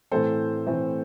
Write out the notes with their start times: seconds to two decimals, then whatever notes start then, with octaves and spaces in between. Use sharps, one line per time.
0.11 A2 E3 A3 C4 A4 C5
0.66 A2 E3 A3 C4